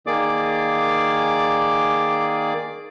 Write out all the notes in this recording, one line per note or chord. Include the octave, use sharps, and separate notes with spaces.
D#3 A#3 G#4 D5 D6